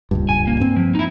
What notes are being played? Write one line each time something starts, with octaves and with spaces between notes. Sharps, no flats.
D#1 C#2 G2
G#5
A#3
G2 C4
F3
D#4 E4